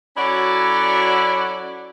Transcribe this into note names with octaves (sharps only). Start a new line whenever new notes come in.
F#3 C#4 E4 F#4 A4 D5